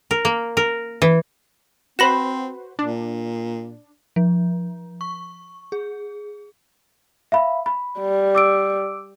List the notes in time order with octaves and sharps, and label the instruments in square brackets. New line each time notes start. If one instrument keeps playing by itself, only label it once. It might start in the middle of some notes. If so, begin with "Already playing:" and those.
[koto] A#4
A#3
A#4
E3
[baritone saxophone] C4 [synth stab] F#4 B4 C5 [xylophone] B5 A#6 E7
[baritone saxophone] A#2 [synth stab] D4
[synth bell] F3
C#6
G#4
[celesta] E5 F5 B5
B5
[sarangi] G3
[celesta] D6 E6 D7